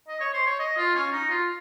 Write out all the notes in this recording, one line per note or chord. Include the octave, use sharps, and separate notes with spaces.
D#5
C#5
C5
C#5
D#5
F4
C#4
D#4
F4